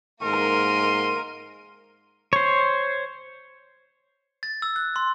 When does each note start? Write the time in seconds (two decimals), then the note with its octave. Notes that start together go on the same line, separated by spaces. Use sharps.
0.23 G#2 A#3 A#4 C6 D#7
2.33 C5 C#5
4.43 A6
4.62 E6
4.76 F#6
4.96 C6